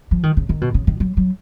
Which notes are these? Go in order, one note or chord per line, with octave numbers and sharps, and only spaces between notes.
F3
D#3
C#3
D#3
B2
C#3
D#3
F#3
F#3